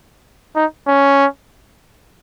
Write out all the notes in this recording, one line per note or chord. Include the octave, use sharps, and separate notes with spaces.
D#4
C#4